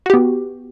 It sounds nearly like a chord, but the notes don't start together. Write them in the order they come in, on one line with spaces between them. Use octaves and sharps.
F#4 G4 B3